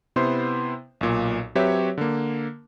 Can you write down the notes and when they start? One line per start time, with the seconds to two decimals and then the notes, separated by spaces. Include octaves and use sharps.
0.16 C3 B3 E4 C5 C6
1.01 B1 A#2
1.55 F#3 C4 G4 B4 C#5 E5
1.98 D3 A#3